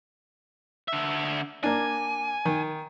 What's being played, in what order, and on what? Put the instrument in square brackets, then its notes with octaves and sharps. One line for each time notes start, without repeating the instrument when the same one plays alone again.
[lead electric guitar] D3 E5
[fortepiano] A#3 D4 [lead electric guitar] G#5
[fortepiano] D#3